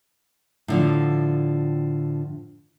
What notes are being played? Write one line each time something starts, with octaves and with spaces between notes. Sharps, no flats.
A2 D3 F3